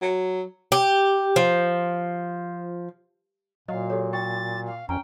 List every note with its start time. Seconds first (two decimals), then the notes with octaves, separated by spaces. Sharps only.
0.02 F#3
0.72 G4
1.36 F3
3.68 A#2 F#3 D#5 F5
3.90 G4 A4 C#5
4.13 G5 C#6 A6
4.66 F5
4.89 F2 C#4 G5 A#5